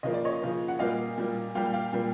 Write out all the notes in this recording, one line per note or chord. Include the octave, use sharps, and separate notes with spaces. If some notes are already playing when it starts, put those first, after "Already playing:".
C#3 F3 A#3 D#5
D5
C#5 D#5
C#3 F3 A#3
F#5
A#2 G3 A#3 D#5 F5
A#2 G3 A#3
A#2 G3 A#3 F5 G5
F5 G5
A#2 G3 A#3